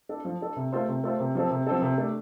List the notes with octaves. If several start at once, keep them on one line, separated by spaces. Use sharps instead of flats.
D4 A4
F3
D4 A4
C3
A3 F4 C5
C3
A3 F4 C5
C3
F3 C4 A4
C3
F3 C4 A4
C3
A3 D4